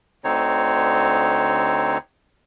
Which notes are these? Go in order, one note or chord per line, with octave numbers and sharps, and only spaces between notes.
D2 D3 C4 D#4 C#5